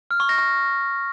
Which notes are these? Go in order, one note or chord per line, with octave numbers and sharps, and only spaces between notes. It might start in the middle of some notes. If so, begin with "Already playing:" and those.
F6
C#6
A#6
C#6